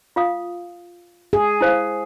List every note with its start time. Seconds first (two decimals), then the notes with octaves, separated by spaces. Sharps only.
0.16 F4 F5 D#6
1.33 G#4
1.61 E4 C5 F5